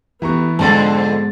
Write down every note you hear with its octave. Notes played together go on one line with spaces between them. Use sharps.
E3 A3 B3 G4 A#5 C#6
F2 G#2 B2 D3 G#3 C4 A5 A6